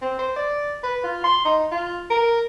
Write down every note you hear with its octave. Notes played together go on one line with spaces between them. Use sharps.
C4
C5
D5
B4
F4
C6
D#4
F4
A#4